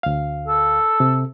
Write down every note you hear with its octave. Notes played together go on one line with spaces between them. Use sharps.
D2 F5
A4
C3